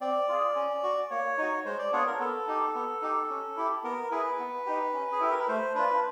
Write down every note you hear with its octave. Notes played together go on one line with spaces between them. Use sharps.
C4 D5
F4 G#4
C#4
F#4
A#3 C#5
D#4 F#4
G#3 C5
D5
B3 D4 F4 G#4 C#5
A#4
B3 A4
D#4 G4
B3
D#4 G4
C#4
E4 G4
B3 A#4
E4 G#4 B4
B3
D#4 G4
C#4
G#4
E4 G4 A4
A#4
B4
A3 C5
D4 F4 B4